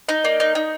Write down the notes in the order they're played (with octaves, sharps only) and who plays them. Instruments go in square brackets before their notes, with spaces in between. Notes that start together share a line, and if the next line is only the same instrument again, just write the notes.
[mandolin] D#4 [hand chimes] D#5
[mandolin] A#3 [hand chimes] D5
[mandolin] D#4 [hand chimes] D#5
[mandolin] D#4